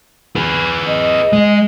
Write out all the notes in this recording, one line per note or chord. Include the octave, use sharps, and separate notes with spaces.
G#4 B4
D#5
G#3